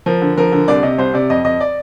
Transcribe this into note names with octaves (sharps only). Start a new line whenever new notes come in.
F3 A#4
D3
F3 A#4
D3
C2 D5
C3 D#5
C2 C5
C3 D5
F2 D#5
F2 D#5
D5